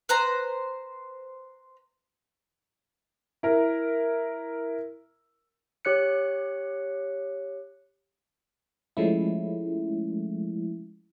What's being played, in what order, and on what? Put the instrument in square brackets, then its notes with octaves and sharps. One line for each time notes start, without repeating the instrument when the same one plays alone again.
[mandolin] B4 C5 A#5
[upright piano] E4 A#4
[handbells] G4 C#5 F#6 C#7
[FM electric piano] F3 G#3 A3 C#4 E4